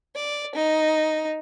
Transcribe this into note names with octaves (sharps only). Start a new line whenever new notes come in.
D5
D#4